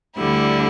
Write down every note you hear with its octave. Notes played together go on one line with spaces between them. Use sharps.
D2 D3 G3 E4